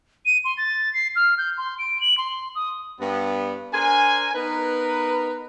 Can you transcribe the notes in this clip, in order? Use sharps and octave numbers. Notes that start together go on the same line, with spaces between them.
D#7
C6
A6
C7
F6
G6
C6
D7
F#7
C6
D#6
G2 B3
D4 A#4 C5 G#5
B3 D#4 A#4 B4